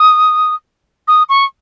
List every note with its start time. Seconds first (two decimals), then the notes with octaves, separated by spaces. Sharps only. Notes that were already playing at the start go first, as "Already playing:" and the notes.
Already playing: D#6
1.08 D#6
1.29 C#6